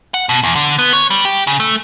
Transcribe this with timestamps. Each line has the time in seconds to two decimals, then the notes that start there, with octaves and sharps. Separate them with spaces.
0.14 F#5
0.29 B2
0.44 E2
0.55 D3
0.79 B3
0.93 C#5
1.10 G3
1.25 G4
1.47 C#3
1.60 A3